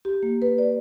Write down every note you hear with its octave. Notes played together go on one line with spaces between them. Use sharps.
G4
A#3
B4
D5